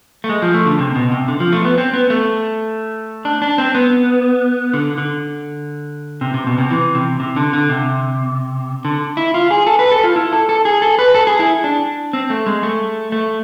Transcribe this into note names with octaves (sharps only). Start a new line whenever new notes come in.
A3
G#3
F3
A3
D3
C3
B2
C3
D3
F3
A3
B3
C4
B3
A3
D4
D4
C4
B3
D3
D3
C3
C3
B2
C3
E3
C3
C3
D3
D3
C3
D3
E4
F4
G#4
A4
B4
A4
F4
E4
A4
A4
G#4
A4
B4
A4
G#4
E4
D4
C4
A3
G#3
A3
A3